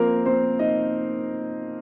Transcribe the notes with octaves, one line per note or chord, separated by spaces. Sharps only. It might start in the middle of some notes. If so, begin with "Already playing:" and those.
Already playing: F3 A#3 C4 F4 A#4 C5
C4 C5
D#4 D#5